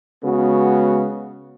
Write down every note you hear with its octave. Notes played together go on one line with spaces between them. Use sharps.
C#3 G#3 B3 F#4